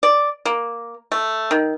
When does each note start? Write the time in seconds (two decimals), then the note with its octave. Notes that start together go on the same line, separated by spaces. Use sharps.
0.03 D5
0.45 A#3
1.12 A3
1.51 D#3